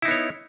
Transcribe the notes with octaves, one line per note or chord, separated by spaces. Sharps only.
B3 D#4 E4 C#5